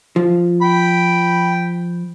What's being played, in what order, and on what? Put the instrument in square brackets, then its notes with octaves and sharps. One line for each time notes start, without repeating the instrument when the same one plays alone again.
[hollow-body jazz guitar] F3
[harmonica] G5 B5